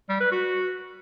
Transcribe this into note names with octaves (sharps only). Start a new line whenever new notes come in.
G3
B4
F#4